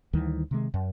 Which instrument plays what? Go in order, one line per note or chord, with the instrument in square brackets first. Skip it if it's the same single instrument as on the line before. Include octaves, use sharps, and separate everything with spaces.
[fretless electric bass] D2 D#3 E3 G3
C3 D#3 G#3
F#2